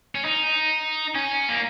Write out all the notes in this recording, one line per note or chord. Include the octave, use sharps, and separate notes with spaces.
C#4
D#4
C#4
A#3